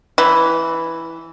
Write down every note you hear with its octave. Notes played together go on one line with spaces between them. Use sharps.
E3